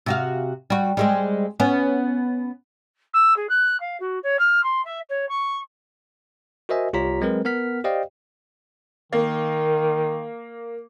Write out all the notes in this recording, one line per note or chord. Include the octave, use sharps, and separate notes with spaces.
C3 F#4 F5
G3 F#4
G3 G#3 C4
B3 C#4
E6
G#4
F#6
F5
F#4
C#5
F6
C6
E5
C#5
C#6
F#4 A#4 C5 D#5 E5 G#5
C2 F4 G4 C#5 A#5 B6
F#3 G#3 C4 A#4 B4
B3 A#4 F#5 F6 B6
G4 C5 D5 D#5 F5 G5
D#3 A#3